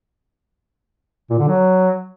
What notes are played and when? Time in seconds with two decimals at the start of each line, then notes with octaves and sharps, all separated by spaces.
1.30 A#2
1.39 D3
1.48 F#3